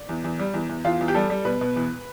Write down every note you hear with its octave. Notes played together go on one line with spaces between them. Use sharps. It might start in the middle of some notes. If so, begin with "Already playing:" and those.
Already playing: D5
E2
E2
G3
E2
E2
E2 F4
E2
G4
G3 A4
G3
B2 B4
B2
E2